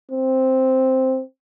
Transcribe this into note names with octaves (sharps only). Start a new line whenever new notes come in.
C4